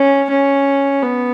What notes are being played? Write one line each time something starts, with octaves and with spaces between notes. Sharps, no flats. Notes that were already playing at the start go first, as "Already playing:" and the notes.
Already playing: C#4
C#4
B3